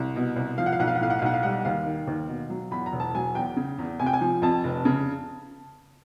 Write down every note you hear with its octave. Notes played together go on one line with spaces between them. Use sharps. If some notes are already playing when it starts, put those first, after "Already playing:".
Already playing: C2
B2
C2
F3 F5
F#5
F5
B1 F#5
F5
F#5
A2 F5
F#5
F5
B1 F#5
F5
G3 F#5
D#2 F5
D#3
D#2
B2
F#3
E2 B5
A#5
E1
A5
F#3 G#5
E2 G5
C#3
E2
C3 G#5
G5
G#5
F3
F2 A5
F1
C#3